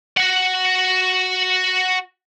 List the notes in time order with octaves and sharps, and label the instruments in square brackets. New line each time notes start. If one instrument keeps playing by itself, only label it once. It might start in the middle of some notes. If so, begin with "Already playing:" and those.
[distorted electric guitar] F#4 F#5